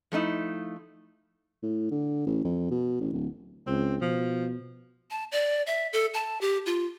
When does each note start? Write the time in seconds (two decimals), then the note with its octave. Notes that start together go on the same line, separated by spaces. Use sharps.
0.12 F3 A3 D#4 E4
1.63 A2
1.91 D3
2.27 A1
2.44 F2
2.71 B2
3.01 A1
3.13 D1
3.67 C#2 C4
4.01 B2 F3
5.11 A5
5.32 D5
5.67 E5
5.93 A4
6.14 A5
6.41 G4
6.66 F4